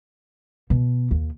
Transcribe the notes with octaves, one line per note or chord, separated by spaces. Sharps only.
B2
D#2